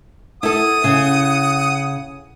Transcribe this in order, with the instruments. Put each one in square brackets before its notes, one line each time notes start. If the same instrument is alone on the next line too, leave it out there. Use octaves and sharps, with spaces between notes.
[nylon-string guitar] E4 A4 [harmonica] F#5 D#6
[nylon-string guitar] C#3